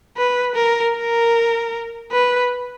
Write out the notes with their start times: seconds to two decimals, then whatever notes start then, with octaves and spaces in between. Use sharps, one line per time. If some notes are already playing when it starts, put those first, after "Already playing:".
0.17 B4
0.56 A#4
0.95 A#4
2.12 B4